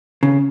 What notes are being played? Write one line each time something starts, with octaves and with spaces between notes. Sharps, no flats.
C#3